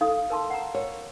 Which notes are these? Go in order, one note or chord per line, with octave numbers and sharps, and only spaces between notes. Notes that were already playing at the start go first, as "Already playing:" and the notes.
D#4 A4 F5 D#6
A#4 A5 C6
F#5 A#5
A#4 C#5